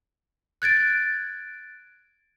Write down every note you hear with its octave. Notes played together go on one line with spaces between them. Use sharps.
F#6 G#6 A6 D7